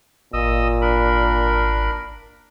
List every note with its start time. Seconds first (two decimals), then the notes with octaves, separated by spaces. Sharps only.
0.33 G#1 A#2 D#5 D#6 E6
0.81 D4 A#4 B5